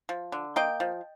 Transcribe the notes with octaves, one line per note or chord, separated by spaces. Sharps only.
F3
D3
A#3 D#5 G5
F3